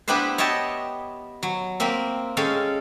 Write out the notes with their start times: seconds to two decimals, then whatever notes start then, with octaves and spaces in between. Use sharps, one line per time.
0.08 B3 D4 E4 G4 B4 C5
0.38 C#5 D#5 E5 G5 A5
1.43 F#3
1.80 A#3 C4 E5
2.37 G#3 C#4 A4 F5 G5